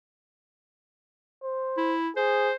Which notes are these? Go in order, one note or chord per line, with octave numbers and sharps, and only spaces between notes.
C5
E4
G#4 C5